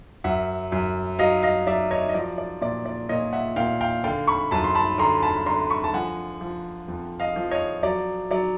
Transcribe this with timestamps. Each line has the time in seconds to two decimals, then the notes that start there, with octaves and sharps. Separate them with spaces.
0.24 F#2 E5 F#5
0.72 F#2
1.19 F#3 D#5 F5
1.43 D#5 F5
1.67 F#3 D5 E5
1.91 C#5 D#5
2.09 D#5
2.14 F3 D5
2.38 D5
2.61 A#2 D5
2.86 D5
3.09 A#2 C#5 D#5
3.33 E5 F#5
3.56 A#2 F5 G5
3.81 F5 G5
4.04 D3 F5 G5
4.27 B5 C#6
4.51 F#2 A5 B5
4.64 C6
4.75 A5 B5
4.98 D3 A#5 C6
5.23 A5 B5
5.46 D3 A#5 C6
5.70 B5 C#6
5.84 A5
5.93 F3 F#5 G#5
6.41 F3
6.88 F2
7.20 D#5 F5
7.36 F3
7.51 C#5 D#5
7.83 F#3 D5
8.31 F#3 D5